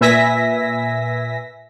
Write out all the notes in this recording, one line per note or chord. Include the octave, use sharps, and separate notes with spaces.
A#2 B4 E5 G#5 A#6 B6